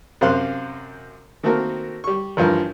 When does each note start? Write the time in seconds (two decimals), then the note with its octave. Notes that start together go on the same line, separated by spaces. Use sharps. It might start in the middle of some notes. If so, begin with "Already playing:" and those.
0.21 F#2 C3 C5 F5 C6 F#6
1.43 D#3 A3 A#3 C4 F#4 A#4
2.04 G3 C#6
2.37 A1 G2 F3 A#4